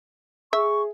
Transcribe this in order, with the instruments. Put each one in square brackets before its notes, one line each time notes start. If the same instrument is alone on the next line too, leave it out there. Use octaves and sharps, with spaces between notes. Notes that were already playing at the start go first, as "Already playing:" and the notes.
[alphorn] G#4 [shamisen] E5 [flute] C#6